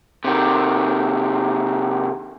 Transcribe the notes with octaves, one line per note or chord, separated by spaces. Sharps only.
C3 D#3